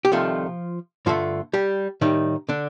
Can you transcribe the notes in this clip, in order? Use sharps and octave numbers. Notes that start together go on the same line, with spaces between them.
G4
C2 C3 D#3 F3 A3 F4
G2 D3 F3 A3 F4
G3 G4
A2 D#3 G3 D#4
D3 D4